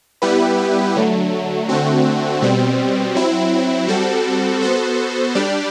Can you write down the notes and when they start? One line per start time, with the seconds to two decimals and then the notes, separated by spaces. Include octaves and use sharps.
0.22 G3 B3 E4 G4 B4
0.96 D3 F#3 A3
1.69 D3 A3 C4 F#4
2.42 B2 G3 C4
3.15 F#3 C4 E4
3.88 G3 C4 F#4 A4
4.62 B3 F#4 A4 C5
5.35 G3 D4 G4 D5